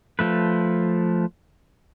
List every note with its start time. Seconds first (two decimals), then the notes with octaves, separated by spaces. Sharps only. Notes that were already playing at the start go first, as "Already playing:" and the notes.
0.19 F3 A3 B4